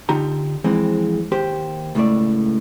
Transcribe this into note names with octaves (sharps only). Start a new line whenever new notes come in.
D3 D#4 F4 G4 A#5
F2 E3 G#3 C4
D#2 G4 C5
C#2 A2 A3 D5